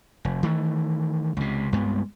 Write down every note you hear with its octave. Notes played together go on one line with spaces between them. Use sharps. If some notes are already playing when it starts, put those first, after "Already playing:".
F1
D#3 E3 A3
C#2 C3
C2 G2 G#3 B3